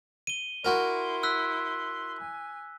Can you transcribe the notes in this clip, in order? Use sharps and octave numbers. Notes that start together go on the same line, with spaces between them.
D#7 G7
E4 F#4 A#4 C6
E6 F#6 B6
G#5